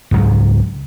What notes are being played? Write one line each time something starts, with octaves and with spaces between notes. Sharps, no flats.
C#2 G#2 F#3